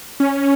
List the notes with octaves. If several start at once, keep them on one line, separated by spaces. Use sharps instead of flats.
C#4